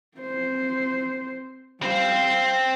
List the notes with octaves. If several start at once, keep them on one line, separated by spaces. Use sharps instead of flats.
C4 C5
G3 C4 C5 F5